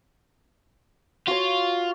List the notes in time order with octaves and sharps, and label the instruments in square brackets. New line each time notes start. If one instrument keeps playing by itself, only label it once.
[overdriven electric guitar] F4 [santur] F#4 C#5